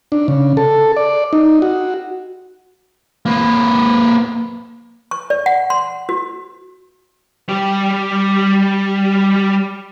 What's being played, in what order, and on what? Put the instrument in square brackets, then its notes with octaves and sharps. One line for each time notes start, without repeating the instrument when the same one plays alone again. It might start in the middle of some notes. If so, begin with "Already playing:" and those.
[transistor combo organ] D4
C#3
A4
D5
D#4
F#4
[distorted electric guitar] A#3 B4
[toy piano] C#6
D5
F#5
C6
F#4
[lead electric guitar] G3 G4